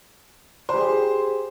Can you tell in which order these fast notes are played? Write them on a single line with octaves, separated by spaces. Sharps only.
C5 G4 G#4